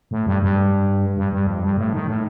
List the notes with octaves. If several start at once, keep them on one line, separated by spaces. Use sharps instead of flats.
A2
G2
G2
G2
G2
F2
G2
A2
D#3
A2